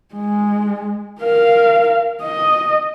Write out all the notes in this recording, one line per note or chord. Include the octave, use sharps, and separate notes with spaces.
G#3
A#4 F5
D#5